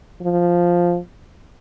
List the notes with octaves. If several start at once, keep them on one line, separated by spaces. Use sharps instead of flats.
F3